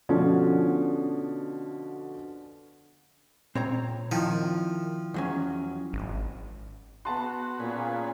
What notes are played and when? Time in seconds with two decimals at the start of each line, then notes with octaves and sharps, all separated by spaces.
0.09 B2 D3 F3 C#4 F#4
3.55 A#2 C4 C#5 A#5
4.12 D#3 F3 E4 G5
5.14 E2 F#3 C#4
5.93 G#1
7.05 B3 F#4 A5 C6
7.60 A#2 C#4 G#4 B4